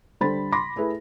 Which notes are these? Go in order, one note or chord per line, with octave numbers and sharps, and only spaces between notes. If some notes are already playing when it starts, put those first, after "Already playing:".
D3 G3 A4 C5 B5 A6
B5 C6 D6 A#6
A3 E4 G#4 B4